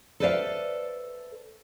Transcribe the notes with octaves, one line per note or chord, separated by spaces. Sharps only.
A4 B4 C5 D5 E5 F5